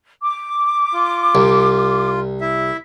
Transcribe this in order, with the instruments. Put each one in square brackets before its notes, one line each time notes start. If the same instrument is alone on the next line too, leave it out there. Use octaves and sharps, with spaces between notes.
[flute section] D6
[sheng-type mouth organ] F4
[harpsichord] C2
[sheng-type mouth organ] E4 E5